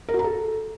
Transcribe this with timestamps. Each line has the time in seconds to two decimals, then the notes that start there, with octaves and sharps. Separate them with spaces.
0.09 A#4
0.14 F#4
0.19 A#5
0.24 A4